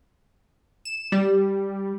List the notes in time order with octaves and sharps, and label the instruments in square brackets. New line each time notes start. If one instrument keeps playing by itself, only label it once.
[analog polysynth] E7
G3